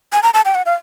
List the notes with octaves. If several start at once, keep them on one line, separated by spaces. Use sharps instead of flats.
G#5
A#5
A5
G5
F#5
F5